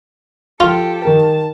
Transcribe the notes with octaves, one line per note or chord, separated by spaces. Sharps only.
F3 F4 G4 A4
D#3 A#4 A5